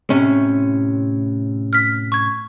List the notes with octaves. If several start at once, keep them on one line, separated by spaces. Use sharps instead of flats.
A2 C3 C#4
F6 B6
C#6 G#6